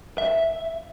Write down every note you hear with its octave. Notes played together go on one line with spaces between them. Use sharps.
E5